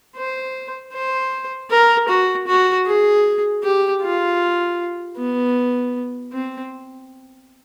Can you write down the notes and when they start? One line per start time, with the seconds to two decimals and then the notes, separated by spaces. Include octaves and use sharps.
0.17 C5
0.93 C5
1.70 A#4
2.09 F#4
2.47 F#4
2.86 G#4
3.63 G4
4.02 F4
5.17 B3
6.33 C4